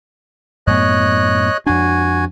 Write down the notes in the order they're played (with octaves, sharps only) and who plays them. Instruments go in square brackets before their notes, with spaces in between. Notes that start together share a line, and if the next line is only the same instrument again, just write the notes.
[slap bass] F#2 A2 B3 [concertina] C#5 D#5 F#6
[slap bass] F2 D4 [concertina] F#4 G#5